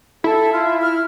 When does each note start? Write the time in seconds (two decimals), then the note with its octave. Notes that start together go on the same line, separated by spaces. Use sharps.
0.24 E4 A4
0.53 F4
0.82 F6